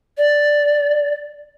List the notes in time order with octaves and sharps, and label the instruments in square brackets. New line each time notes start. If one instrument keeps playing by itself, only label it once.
[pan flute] D5